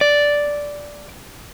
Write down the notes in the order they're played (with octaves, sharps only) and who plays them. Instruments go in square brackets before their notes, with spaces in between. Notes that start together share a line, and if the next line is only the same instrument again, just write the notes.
[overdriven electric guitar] D5